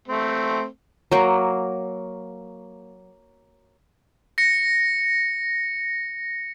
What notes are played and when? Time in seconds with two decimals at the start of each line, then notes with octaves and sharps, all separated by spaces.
0.08 A3 C4
1.12 F#3 A#3
4.38 A#6 C#7